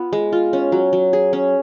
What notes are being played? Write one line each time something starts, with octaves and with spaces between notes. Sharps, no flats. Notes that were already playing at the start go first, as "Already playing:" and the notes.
Already playing: B3 F4
G#3
F4
C#4
F#3
F#3
G#4
C#4